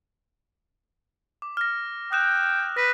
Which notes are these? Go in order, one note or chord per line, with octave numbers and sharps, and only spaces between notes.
D6
F6 A#6
G5 D#6 F#6 E7
B4 A#6